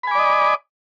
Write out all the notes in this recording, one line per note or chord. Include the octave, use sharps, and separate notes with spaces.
D5 D#5 G#5 B5 D6